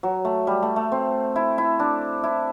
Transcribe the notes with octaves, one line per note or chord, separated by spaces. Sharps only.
F#3
A3
G3
A3
A3
C4
E4
E4
D4
E4